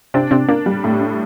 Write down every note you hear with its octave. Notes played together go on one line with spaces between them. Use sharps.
C3 C4 D4
C3 C4 D4
A#3 D4
G3
A2
D4